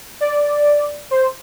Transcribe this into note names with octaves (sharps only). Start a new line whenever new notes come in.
D5
C5